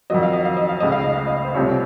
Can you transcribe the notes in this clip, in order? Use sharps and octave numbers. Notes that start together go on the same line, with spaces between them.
F2 D#3 F#3 D#5
F5
D#5
F5
D#5
F5
C#2 C#3 A3 D#5
F5
D#5
F5
D#5
C5
C2 C3 F3 A3 C#5